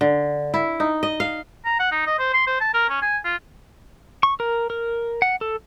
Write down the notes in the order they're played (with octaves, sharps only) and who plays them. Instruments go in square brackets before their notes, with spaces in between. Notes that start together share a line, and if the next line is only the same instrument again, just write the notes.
[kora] D3
E4
D#4
D#5
F5
[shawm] A#5
F#5
D#4
D#5
C5
C6
C5
A5
A#4
C#4
G#5
F4
[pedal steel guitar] C#6
A#4
A#4
F#5
A4